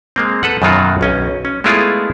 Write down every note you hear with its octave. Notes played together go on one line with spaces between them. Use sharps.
G#3 A#3 C4
A4 B4 F#5
F#2 B2 D#3 F#3 F4 F#4
B1 C#4 D#5
C#4
G#3 A3 B3 E4 F4 G#4